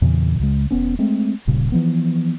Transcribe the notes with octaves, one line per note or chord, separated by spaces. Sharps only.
E2 A#2 C#3 E3
C#2 C#3 G#3
E1 B3 C#4
G#3 A3 C4
D1 G2 A#2 C#3
E3 F3 B3